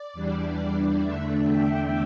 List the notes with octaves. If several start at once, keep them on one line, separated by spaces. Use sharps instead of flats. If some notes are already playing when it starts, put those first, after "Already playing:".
Already playing: D5
E2 E3 G3 D4
E2 D3 A3 D4 E5
G5